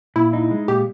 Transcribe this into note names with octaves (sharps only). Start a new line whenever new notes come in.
A#2 E4
D#4
G#3
A#2 G4